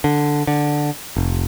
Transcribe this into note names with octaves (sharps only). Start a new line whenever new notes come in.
D3
D3
F1